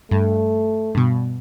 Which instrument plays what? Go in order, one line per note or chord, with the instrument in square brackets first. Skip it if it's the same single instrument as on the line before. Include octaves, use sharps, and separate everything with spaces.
[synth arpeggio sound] G2 [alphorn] A3
[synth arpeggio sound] G2 B2